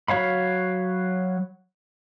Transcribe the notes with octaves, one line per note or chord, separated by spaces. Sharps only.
F#3 C#5 F5 B5